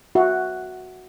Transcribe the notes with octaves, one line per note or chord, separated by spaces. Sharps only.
F#4 E5